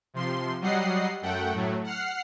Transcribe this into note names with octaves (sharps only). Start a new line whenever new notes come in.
C3 F3 C6
F#3 G3 D#5 F#5 C7
F#2 A3 F#5 G5
A2 F#3 A3
F#5 F6 C7